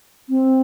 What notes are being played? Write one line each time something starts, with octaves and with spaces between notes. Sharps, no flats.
C4